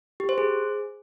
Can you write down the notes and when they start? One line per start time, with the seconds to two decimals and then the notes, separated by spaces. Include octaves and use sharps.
0.20 G4
0.29 C5
0.38 G#4